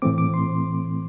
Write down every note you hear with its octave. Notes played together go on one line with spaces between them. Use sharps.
A2 E3 A3 C4 D6
D6
C6